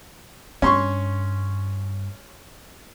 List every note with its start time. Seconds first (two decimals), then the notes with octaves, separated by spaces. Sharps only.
0.62 G2 C#4 C6 C#6